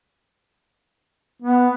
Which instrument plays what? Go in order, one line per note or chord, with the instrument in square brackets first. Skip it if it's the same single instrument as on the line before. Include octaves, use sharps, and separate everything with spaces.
[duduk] B3